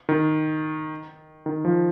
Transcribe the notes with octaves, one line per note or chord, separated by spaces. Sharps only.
D#3
D#3
F3